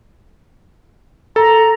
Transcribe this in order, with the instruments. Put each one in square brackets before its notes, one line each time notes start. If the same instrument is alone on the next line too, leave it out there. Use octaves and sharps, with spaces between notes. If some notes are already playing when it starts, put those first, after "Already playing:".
[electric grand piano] A4 [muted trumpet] A#5